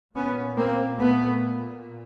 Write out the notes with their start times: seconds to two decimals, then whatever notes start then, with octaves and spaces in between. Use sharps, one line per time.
0.15 A#2 B3 C#4
0.56 A#3 C4
0.98 A3 B3